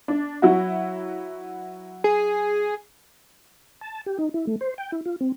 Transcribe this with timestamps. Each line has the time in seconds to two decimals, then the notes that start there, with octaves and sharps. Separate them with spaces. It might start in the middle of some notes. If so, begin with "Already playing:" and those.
0.08 D4
0.42 F#3 E4 F#4
2.04 G#4
3.81 A5
4.06 G4
4.19 D#4
4.34 E4
4.47 A3
4.61 C5
4.78 G5
4.92 E4
5.06 F4
5.20 C4